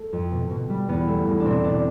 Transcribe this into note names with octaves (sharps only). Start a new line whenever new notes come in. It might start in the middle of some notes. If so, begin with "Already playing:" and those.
Already playing: A3
F2
B2
B2
G3
E2 B3
A3
E2
D4
B2 C4
B2 D4